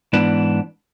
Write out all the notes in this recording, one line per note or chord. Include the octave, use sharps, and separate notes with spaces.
G#2 E3 B3 D4